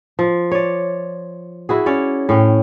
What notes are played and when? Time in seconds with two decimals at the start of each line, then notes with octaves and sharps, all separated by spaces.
0.19 F3
0.51 C#5 D5
1.69 E4 F#4 G#4
1.86 C#4 C#5 D5
2.29 A2 C#4 G5